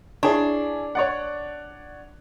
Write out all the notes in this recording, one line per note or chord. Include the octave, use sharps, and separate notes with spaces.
D4 E4 G#4 C#5
C#5 D5 F#5